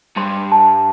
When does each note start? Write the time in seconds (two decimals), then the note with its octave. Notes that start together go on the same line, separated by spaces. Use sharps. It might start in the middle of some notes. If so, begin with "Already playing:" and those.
0.17 G2 C6
0.52 A5